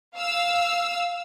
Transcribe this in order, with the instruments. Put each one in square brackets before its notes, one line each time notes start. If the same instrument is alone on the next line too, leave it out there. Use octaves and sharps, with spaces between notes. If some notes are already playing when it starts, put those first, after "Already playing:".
[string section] F5 E6